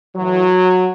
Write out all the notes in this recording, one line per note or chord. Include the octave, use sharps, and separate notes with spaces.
A2 E3 F#3